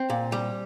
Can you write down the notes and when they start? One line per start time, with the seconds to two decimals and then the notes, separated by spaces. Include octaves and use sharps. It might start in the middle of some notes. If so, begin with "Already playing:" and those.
Already playing: C4
0.10 A#2
0.32 G3